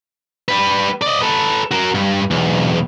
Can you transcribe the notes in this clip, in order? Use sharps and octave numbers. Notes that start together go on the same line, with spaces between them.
G3 B4
D5 D#5
A4 B4
F#4 A#4
G2
B1 E2